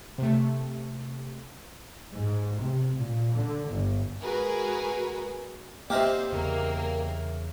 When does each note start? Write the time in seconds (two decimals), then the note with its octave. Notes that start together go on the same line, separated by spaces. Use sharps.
0.18 C3 A3
2.13 G#2
2.60 C3
2.94 A#2
3.32 D3
3.70 G1
4.21 G#3 F#4 G#4 A#4 B4
5.90 A#3 C4 D#4 G4 C5 D5 E5 F6
6.32 E2 C#3 A#3